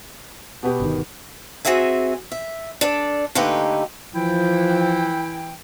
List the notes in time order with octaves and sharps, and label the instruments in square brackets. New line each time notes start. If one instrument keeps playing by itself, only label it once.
[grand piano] B2 B3 G4
[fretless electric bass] G1 C3 D#3
[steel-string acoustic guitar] C4 F#4 G#4 E5 G#5
E5
D4 A4 D5
D3 A3 A#3 D#4 G4 B4
[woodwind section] E3 E4 G5 [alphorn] F3